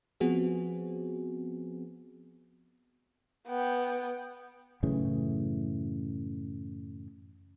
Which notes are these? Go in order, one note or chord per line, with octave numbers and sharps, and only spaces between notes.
F3 B3 C4 F#4 G#4
B3 G5
F#2 A2 C#3 E3